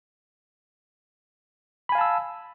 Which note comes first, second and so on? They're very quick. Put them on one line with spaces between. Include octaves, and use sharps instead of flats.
B5 G#5 F5 A5 E6